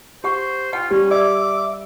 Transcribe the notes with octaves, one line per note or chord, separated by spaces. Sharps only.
G4 C5 F#5 C#6
F4 F#5 G5
G3 C#4 G4
D5 E5 D6